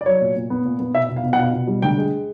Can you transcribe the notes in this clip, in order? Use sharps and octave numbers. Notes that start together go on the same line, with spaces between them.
D5
F#3 C#5
A#2
A#2
B3
A#2
B3
B2 E5
B2
F5
B2
F#5
B2 F5
B2
G3
D2 G5
G#3